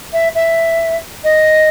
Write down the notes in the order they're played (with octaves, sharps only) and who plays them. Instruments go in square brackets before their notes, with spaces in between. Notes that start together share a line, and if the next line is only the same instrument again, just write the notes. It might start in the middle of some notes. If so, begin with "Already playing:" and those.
[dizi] E5
E5
D#5